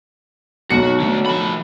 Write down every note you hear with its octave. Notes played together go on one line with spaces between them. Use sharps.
B1 F#4 C#7
D3 A3
F3 B5